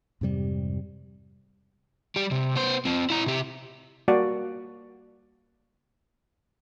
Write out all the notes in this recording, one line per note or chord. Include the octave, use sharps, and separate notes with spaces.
F2 G#2 C3 G3
G3 G4
C3
B3 C5
C4 F4
E4 A#5
C3 G4
G3 A#3 F#4 D5